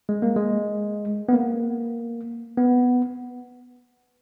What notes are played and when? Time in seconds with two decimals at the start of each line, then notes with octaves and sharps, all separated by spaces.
0.09 G#3
0.22 A#3
0.36 G#3
1.29 B3
1.33 A#3
2.57 B3